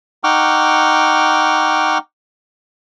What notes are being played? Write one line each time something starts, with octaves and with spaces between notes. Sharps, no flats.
D#4 F#5 G5 C#6 D6 F6